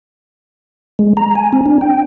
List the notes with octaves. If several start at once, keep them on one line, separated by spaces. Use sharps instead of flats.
G#3
A#5
G#5
C4
D4
G5